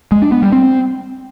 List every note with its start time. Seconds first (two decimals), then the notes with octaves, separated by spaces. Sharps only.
0.12 G#3
0.22 D4
0.32 B3
0.42 G3
0.52 C4